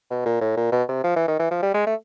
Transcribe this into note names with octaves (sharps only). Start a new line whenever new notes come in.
B2
A#2
A2
A#2
B2
C3
F3
E3
D#3
E3
F3
G3
G#3
A3